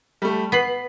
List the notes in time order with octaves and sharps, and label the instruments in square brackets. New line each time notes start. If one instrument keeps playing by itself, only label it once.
[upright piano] G3 A3
[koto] B3 [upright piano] B6 C7 F#7